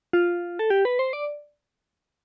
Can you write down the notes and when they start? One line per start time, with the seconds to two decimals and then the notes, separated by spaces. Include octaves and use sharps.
0.13 F4
0.59 A4
0.70 G4
0.85 B4
0.99 C5
1.13 D5